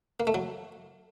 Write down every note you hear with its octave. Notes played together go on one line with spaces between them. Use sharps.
A#3
A3
F#3